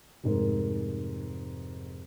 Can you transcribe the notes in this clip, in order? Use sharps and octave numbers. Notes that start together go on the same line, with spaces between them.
F1 G#2 A#4